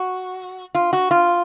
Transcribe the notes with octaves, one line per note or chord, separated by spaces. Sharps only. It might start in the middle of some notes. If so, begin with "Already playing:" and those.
Already playing: F#4
F4
F#4
F4